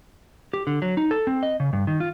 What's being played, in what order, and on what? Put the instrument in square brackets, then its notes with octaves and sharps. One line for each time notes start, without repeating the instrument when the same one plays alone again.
[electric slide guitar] G4
D3
F#3
D#4
A4
C4
D#5
C#3
G2
D#3
F4